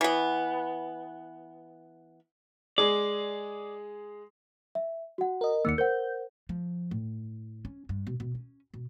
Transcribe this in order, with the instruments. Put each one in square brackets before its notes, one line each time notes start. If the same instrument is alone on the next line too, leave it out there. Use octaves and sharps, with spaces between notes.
[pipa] E3 B3
[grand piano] G#3 G#4 [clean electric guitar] D5
[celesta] E5
F#4 F#5
[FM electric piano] A#4 D#5
[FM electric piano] D#2 D#3 A#3 [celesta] E6 C#7
[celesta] A#4 C5 F#5 [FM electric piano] G6
[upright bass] F3
A2
C#4
G2
B2
B2
C#4
B2